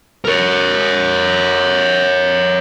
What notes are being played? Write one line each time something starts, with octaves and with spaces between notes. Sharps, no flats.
A#4 C#5